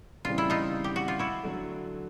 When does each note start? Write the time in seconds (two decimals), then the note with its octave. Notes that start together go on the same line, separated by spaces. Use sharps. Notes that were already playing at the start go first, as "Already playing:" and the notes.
0.25 C#3 E3 G3 C4 F4
0.38 E4
0.50 D#4 F4
0.84 G4
0.96 F#4
1.08 F4
1.19 E4 F#4
1.43 D3 F#3 A3